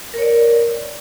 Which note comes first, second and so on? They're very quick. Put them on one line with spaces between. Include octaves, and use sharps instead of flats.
A#4 C#5 D5